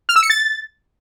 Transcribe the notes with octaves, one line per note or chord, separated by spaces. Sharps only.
F6
E6
C#7
A6